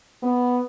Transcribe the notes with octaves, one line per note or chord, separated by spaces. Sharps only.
B3